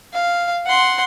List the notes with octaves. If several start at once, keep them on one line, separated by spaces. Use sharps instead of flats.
F5
F#5 C6